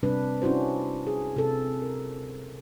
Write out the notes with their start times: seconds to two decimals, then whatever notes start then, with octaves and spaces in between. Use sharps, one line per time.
0.03 C3 G3 D4 B4
0.42 C#4 D4 E4 F#4 C5
1.07 G#4
1.36 C3 A4
1.82 A#4